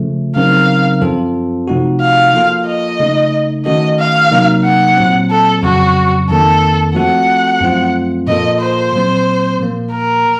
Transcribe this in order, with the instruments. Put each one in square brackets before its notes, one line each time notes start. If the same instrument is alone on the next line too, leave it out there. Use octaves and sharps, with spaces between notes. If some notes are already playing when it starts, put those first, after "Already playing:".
Already playing: [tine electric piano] C#3 F3 A3
[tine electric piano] C#3 F#3 C4 D#4 A#4 [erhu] F5
[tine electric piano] F#2 F3 C4 F4 A4
C3 F3 A3 D#4 F#4
[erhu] F5
[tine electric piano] F3 A#3 F4 A4
[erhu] D#5
[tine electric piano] C#3 A3 D#4
[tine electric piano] D#3 A3 C#4 F#4 A4 [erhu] D#5
[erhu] F5
[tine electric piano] C3 F#3 A#3 D#4
[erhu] F#5
[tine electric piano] A#2 F#3 C4
[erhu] A4
[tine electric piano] F2 C#3 F#3 [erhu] F#4
[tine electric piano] F2 D#3 A#3 [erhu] A4
[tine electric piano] F3 A3 C4 F#4 A4 [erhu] F#5
[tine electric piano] F#2 F3 A3 C4 F4
[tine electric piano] A#2 F3 A#3 F4 A4 [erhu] D#5
[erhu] C5
[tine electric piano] A#2 F#3 C4
A#2 F3 A#3
[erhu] A#4